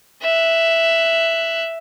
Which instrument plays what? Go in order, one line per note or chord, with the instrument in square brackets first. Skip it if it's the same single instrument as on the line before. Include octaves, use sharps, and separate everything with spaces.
[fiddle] E5 F#6